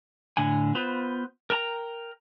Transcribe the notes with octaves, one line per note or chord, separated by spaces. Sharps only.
A2 D3 F#5 G#5
B3 F4 B4 C5
A#4 G5 A5 A#5